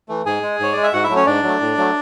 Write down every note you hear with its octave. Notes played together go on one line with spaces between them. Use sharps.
E3 A3
G#2 G#4 G#5
G#3
G#2 C#5
G#3 D5
E5
G#2 F#4 F#5
E4 E5
F#3 A3
C#4 C#5
G#2 D4 D5
F#3 A3
A2
F#3 A3